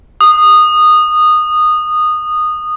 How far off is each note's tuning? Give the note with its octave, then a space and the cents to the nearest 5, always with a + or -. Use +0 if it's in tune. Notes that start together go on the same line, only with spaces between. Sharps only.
D#6 -15